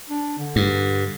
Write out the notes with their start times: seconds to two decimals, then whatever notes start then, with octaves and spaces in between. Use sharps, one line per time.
0.09 D4
0.38 D3
0.56 G2